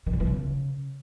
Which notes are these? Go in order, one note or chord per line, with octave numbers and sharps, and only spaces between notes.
D#3
D3
E3
C#3